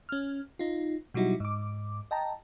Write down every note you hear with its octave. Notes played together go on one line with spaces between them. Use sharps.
C#4 F6
D#4 F4
B2 F#3 G3 D#4 E4 F#4
G#2 D6
D#5 G5 A5 A#5